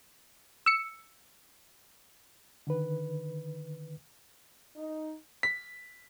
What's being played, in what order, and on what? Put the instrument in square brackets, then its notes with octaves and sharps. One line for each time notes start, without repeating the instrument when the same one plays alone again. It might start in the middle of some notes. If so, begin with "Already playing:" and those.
[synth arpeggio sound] E6 C#7
[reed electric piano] D3 D#3 B4
[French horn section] D#4
[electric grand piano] B6